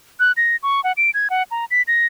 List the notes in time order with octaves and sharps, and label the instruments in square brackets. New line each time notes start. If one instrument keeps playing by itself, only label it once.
[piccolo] F#6
A#6
C#6
F#5
D7
G#6
F#5
A#5
B6
A#6